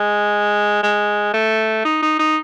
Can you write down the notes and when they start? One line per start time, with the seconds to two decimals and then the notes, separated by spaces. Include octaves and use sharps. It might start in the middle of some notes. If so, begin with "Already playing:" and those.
Already playing: G#3
0.83 G#3
1.34 A3
1.85 D#4
2.02 D#4
2.19 D#4